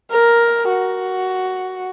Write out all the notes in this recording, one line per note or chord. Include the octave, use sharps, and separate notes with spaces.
A#4
F#4